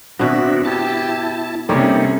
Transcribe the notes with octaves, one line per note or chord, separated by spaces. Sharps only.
B2 D#3 B3 C4 D4 F#4 E5
E4 G4 A5
C3 G3 A#3 C#4 D#4 A4 C#5